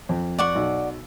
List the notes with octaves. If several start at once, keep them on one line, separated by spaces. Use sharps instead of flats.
F2
D5 F#5 C#6
B1